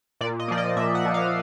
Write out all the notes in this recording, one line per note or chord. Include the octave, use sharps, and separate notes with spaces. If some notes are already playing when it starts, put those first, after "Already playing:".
A#2 D5
D#5
F3 A#3 D5
D#5
A#2 E5
F#5
F3 A#3
F5